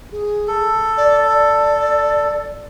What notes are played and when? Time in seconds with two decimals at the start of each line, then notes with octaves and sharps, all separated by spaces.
0.12 G#4
0.48 A4
0.97 D5
1.27 D5